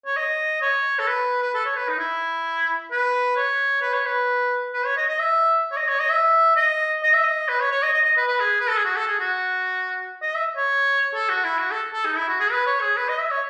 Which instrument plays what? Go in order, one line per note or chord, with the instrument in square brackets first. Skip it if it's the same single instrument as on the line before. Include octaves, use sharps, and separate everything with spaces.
[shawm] C#5
D#5
C#5
A4
B4
B4
A4
C#5
B4
D#4
E4
B4
C#5
B4
C#5
B4
B4
C#5
D#5
D#5
E5
C#5
D#5
C#5
D#5
E5
D#5
D#5
E5
D#5
B4
C#5
C#5
D#5
D#5
D#5
B4
B4
G#4
B4
A4
G#4
F#4
A4
G#4
F#4
D#5
E5
C#5
A4
F#4
E4
F#4
A4
A4
D#4
E4
F#4
G#4
B4
C#5
G#4
B4
D#5
E5
C#5